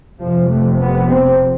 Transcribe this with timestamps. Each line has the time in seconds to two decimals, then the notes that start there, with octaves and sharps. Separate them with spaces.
0.20 F1 F2 C3 F3
0.50 A3
0.79 B3
1.09 C4